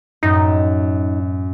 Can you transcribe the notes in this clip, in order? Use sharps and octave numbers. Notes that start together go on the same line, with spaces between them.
F#2 A2 D#4